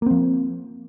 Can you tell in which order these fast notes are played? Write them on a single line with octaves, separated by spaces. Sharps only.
A#3 C4 F3